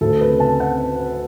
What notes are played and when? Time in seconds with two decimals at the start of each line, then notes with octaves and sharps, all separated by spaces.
0.01 D2 A4
0.21 B4
0.30 C#3
0.40 A5
0.60 F#5